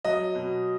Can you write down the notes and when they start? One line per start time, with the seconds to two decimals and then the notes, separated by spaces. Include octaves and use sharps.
0.05 F#3 D#5
0.35 B2